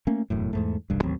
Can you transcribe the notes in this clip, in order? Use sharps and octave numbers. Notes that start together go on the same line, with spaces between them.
A3 A#3 C#4
E1 F#2 A2
E2 G#2 A3
E1 C2 G2
A1 D#2 F#3 C4